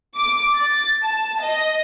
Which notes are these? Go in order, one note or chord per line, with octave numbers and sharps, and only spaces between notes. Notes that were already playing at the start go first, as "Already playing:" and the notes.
D6
A6
A5
D#5